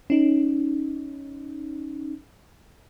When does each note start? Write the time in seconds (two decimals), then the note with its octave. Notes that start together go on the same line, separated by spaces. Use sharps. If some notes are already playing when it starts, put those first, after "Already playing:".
0.10 C#4 D#4